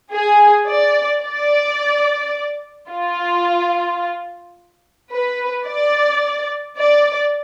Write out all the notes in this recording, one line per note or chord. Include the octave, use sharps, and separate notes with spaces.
G#4
D5
D5
F4
B4
D5
D5